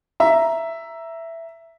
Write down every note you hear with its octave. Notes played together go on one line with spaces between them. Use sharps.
E5 A#5